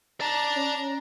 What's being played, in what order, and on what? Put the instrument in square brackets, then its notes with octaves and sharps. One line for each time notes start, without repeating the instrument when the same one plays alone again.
[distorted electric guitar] D5 A5 [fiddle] A#5
[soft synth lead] C#4